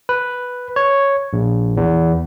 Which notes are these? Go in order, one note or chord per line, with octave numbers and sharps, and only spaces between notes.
B4
C#5
A#1
E2